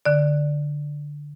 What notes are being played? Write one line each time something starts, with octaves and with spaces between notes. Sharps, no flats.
D3 D5